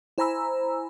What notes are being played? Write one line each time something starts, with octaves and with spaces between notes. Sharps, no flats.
E4 C5 G#5 A#5 B5 E6